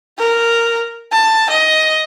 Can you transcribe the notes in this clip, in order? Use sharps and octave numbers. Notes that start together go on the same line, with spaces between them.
A#4
A5
D#5